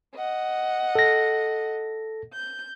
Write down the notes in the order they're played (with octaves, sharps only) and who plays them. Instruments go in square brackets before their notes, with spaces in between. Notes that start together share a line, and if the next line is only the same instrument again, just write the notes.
[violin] D#5 F#5
[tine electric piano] A4 A#6
[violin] G6